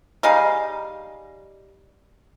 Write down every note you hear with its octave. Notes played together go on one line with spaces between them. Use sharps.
G3 D#4 G#4 F5